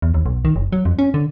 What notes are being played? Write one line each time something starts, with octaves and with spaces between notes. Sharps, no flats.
E2
D#2
B1
D#3
F#1
F#3
F2
C#4
D3